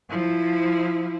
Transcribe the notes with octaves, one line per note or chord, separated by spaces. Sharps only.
F3 E4